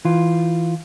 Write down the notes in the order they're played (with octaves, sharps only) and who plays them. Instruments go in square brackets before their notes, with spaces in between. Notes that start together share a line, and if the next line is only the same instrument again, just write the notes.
[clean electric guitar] E3 F4